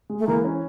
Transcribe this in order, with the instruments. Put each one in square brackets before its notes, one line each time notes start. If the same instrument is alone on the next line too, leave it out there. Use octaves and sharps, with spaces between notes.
[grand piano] G#3
[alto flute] A3
[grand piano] E3 [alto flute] A#3
[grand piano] C#4